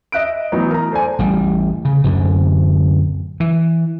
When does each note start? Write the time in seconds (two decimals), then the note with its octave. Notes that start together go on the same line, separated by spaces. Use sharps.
0.12 D#5 E5 F#6 D7
0.52 A2 E3 F#3 B3 D#4
0.71 A#4 A#5
0.91 A4 C5 D5 G#5
1.19 A1 G3
1.85 C#3
2.04 D1 F#2 D3
3.40 E3